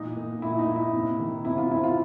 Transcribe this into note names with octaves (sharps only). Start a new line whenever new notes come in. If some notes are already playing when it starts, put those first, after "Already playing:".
Already playing: A#2 E3 D#4
A#2
A#2 E4
D#4
A#2
E4
C3
D#3
C3 E4
F4
C3 E4
F4